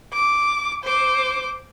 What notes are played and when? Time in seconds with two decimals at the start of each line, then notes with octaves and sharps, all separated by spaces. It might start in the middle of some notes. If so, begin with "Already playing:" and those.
0.13 D6
0.84 C5 D6